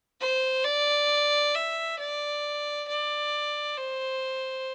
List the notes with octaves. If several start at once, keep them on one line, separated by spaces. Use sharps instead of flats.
C5
D5
E5
D5
D5
C5